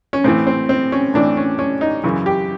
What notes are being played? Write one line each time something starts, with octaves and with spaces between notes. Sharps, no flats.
C#4
A2 E3 C4
C4
C4
C#4
A2 E3 D4
C#4
C#4
D#4
F#2 C#3 E3
G4